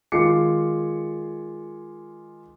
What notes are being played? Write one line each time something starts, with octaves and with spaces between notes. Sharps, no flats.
D#3 G#3 F4 D6 C7 C#7